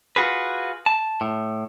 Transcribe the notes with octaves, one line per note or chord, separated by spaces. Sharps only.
F4 F#4 G#4 B4
A5
A2